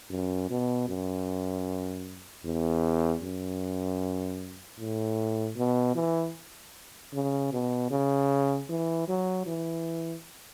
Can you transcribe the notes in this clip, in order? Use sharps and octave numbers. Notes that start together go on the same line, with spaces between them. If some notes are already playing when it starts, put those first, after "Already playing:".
F#2
B2
F#2
E2
F#2
A2
B2
E3
C#3
B2
C#3
E3
F#3
E3